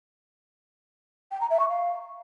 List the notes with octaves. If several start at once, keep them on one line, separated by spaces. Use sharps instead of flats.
G5
A#5
E5
C#6
F5